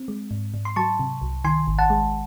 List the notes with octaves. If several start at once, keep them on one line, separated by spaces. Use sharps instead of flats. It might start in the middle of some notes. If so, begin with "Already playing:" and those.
Already playing: C4
G#3
G#2
G#2
C6
F#3 A5 C#6
C3
C2
D#3 G#5 C6
G#1
F#5 A5
G#3